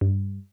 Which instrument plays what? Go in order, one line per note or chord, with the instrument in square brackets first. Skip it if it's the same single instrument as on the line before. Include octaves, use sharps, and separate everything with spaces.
[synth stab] G2